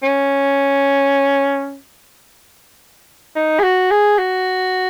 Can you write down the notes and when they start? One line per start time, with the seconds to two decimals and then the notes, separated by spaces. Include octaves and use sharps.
0.03 C#4
3.36 D#4
3.59 G#4
3.63 F#4
3.91 G#4
4.18 F#4